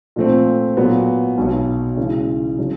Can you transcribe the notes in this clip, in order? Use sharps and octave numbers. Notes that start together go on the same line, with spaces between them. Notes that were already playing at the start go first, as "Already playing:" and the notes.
A#2 F3 A3 C4
A#2 F#3 B3
B1 B2 F#3
C#3 E3 G#3
C#3 F#3